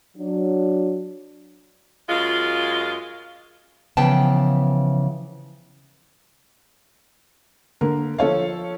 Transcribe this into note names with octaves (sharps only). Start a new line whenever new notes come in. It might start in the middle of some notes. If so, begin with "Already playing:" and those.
F#3 D4
F#2 G#3 F4
C#3 E3 F3 B3 G5 A5
D3 A#3 A#4
F3 A4 C#5 F5